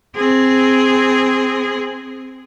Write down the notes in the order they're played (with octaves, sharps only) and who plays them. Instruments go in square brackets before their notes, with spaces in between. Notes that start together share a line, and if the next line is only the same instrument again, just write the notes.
[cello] C4 G#4